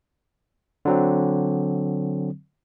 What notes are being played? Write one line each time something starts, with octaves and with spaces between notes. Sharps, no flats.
D3 F#3 C4